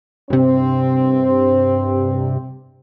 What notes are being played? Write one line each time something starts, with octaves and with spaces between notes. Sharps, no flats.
G2 C3 C4